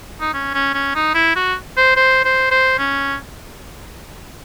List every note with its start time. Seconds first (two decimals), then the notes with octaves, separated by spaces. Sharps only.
0.21 D#4
0.34 C#4
0.54 C#4
0.74 C#4
0.95 D#4
1.15 E4
1.36 F#4
1.77 C5
1.96 C5
2.25 C5
2.51 C5
2.79 C#4